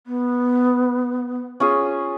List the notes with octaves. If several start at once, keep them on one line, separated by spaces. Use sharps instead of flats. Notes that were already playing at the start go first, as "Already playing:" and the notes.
B3
C#4 F4 G#4